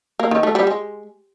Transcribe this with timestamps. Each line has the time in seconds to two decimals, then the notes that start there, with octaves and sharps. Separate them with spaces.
0.20 A#3
0.31 D#3
0.43 A3
0.55 G3
0.67 G#3